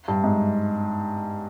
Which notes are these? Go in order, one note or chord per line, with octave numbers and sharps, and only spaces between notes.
G2
G#2